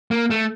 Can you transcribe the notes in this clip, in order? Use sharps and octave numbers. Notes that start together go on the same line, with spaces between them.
A#3
A3